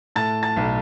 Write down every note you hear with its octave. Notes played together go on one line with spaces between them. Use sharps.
A2 A5 A6
A5 A6
B1